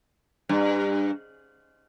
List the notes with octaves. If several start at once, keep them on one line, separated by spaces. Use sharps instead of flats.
G2